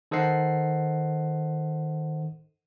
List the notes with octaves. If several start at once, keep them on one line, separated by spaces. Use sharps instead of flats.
D#3 A4 C5 D#5 F#5 C7